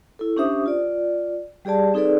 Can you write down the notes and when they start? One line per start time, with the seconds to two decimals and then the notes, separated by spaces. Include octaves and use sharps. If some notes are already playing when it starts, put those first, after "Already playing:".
0.19 E4 A4
0.37 C#4 D4 G4 C5 E5 D#6
0.66 F4 D5
1.65 G3 G4 G#4 D5 A5
1.94 C4 D#4 G#4 A4 B4 D5